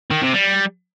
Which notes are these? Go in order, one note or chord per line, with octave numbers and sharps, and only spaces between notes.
D#3
C3
G3